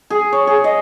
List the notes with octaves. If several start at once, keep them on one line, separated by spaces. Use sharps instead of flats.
G#4
C#5
G#4
D#5